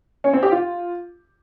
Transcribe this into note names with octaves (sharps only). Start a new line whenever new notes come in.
C#4
C4
G4
F4